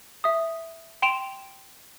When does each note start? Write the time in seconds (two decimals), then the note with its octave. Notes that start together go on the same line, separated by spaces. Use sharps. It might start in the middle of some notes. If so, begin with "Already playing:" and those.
0.24 E5 D#6
1.02 G5 C6 D7 E7 F7